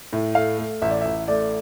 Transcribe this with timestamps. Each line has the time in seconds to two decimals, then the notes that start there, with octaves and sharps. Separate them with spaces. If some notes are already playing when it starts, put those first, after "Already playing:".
0.13 A2
0.35 A3 F5
0.58 A3
0.82 A1 E5
0.91 D5
1.01 A1 E5
1.28 A3 D5